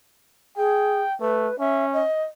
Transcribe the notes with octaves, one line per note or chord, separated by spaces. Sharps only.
G#4 G5
A3 B4
C#4 E5
D#5